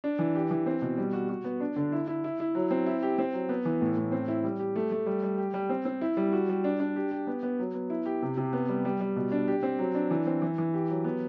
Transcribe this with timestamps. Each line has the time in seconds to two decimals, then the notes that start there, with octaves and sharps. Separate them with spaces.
0.04 D4
0.19 E3
0.35 G4
0.51 E3
0.66 C4
0.82 B2
0.97 G3
1.13 F#4
1.29 F#4
1.44 B3
1.60 D4
1.76 D3
1.92 E4
2.07 E4
2.24 E4
2.40 E4
2.55 F#3
2.71 C4
2.86 E4
3.02 G4
3.18 C4
3.33 F#3
3.49 B3
3.65 E3
3.81 A2
3.97 A2
4.12 C4
4.28 E4
4.44 G3
4.59 G4
4.76 A3
4.92 A3
5.06 G3
5.23 G3
5.38 G4
5.54 G3
5.69 C4
5.85 C4
6.01 E4
6.17 G3
6.32 F#4
6.49 G3
6.64 D4
6.80 D4
6.96 G4
7.11 G4
7.27 B3
7.43 B3
7.59 F#3
7.74 B3
7.90 E4
8.06 G4
8.22 C3
8.37 C3
8.53 B3
8.69 G3
8.85 G3
9.00 G3
9.16 B2
9.32 D4
9.48 G4
9.63 C4
9.79 F#3
9.95 D4
10.11 E3
10.26 C4
10.42 E3
10.58 E3
10.74 G4
10.90 F#3
11.04 B3